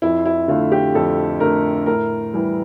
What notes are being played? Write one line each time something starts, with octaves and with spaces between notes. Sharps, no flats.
F2 E4
E4
D3 A3 F4
G4
F2 A4
D3 A3 A#4
A2 A#4
E3 G3